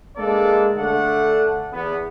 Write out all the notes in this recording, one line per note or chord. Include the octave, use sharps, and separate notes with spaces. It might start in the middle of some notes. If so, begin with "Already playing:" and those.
G#3 A#3 D4 A4 D5
D3 A3 D4 F#5
E2 B3